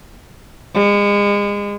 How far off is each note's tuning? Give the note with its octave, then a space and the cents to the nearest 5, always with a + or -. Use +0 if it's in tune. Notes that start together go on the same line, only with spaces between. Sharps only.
G#3 -35